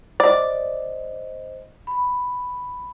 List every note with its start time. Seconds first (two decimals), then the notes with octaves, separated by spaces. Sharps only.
0.20 C5 D5 D#5
1.87 B5